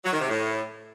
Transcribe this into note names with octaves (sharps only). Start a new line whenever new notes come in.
F#3
D#3
C3
A2